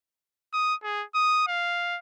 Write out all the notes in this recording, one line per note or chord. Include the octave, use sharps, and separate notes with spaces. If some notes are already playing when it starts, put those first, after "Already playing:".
D#6
G#4
D#6
F5